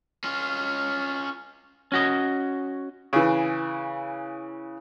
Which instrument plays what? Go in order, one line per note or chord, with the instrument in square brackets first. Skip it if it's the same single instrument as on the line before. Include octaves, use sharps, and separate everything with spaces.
[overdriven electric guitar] C#4 F4
[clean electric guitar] C#4 F#4 D#5
[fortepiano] C#3 E3